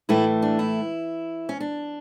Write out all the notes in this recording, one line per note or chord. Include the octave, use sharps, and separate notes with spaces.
A2 E3 A3 E4
D4
E4
C#4
D4